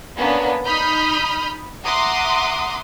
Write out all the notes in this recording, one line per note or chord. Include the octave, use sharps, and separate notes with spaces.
A#3 B3 C#4 D4
D#4 B5 D#6 F6 G6
E5 F#5 A#5 C6 D6 D#6